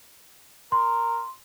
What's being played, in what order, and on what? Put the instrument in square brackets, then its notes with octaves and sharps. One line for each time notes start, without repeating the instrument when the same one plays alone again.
[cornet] A#4 [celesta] C6